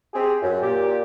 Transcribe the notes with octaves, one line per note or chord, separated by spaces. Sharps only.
C4 G4 G#4
F#2
A#2 G4